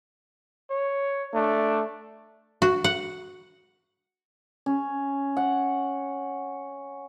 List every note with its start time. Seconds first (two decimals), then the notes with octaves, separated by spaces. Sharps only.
0.70 C#5
1.34 A3 D4
2.62 F#4
2.84 F#5
4.66 C#4
5.37 F#5